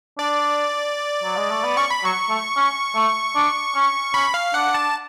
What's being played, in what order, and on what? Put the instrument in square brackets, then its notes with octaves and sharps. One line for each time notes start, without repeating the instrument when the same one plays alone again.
[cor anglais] D4 [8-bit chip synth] D5
[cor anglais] F#3
G#3
A3
B3
[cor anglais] C#4 [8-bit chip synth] C#6
[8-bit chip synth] B5
[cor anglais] F#3 [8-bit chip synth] C#6
[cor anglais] A3
C#4
A3
D4
C#4
[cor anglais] C#4 [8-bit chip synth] B5
[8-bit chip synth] F5
[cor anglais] D4 [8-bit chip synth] F#5
[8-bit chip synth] A5